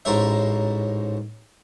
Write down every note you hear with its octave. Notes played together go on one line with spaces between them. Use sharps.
A1 G#2 C#4 A#4 E5